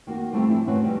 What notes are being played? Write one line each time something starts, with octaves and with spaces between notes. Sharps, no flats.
D#3 A#3 F#4 A#4
G3 A3 C4 E4 F4 G4
E3 F3 D4 E4
A3 C4 C#4 F#4 A4 B4
F2 C3 D#3 E3 G3